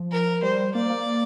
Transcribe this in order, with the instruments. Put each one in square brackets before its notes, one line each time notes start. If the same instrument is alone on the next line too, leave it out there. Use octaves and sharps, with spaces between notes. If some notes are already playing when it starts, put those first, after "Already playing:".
Already playing: [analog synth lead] F3
[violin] A#4
[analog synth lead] G3 [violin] C5
[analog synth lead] A#3 [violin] D5
[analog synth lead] A#3